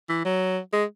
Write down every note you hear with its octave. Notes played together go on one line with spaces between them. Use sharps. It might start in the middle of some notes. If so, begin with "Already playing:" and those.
E3
F#3
G#3